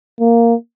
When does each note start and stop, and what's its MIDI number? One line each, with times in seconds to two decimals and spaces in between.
0.20 0.54 58